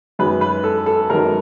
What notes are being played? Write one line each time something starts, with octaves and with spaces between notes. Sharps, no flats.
F#2 D#3 G#3 B4
B4
A4
A4
F#2 D#3 G#3 A#4